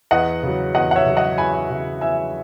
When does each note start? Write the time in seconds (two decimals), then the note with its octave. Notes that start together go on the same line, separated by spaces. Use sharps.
0.11 E2 D#5 F#5
0.43 C#3 F#3
0.75 E2 D#5 F#5
0.91 F#5
0.96 C#5 E5
1.06 C#3 F#3
1.17 D#5 F#5
1.38 E2 G#5 B5
1.70 C#3 F#3
2.01 E2 E5 G#5